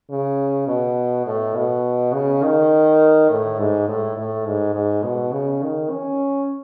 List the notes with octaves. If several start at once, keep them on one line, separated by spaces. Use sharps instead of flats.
C#3
B2
A2
B2
C#3
D#3
A2
G#2
A2
A2
G#2
G#2
B2
C#3
D#3
C#4